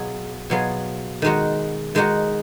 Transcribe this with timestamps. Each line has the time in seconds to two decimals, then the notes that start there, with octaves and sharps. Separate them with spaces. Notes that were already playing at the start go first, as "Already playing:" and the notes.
Already playing: B2 F#3 B3 F4 G#4
0.50 B2 F#3 B3 F4 G#4
1.22 D#3 G#3 D#4 F#4
1.95 D#3 G#3 D#4 F#4